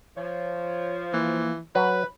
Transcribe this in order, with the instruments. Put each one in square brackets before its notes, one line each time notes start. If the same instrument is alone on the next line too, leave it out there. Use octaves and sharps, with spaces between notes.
[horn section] F3 [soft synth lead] C#5
[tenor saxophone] E3 [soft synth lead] A#3
[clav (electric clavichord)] F#3 [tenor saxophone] B4 [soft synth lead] B5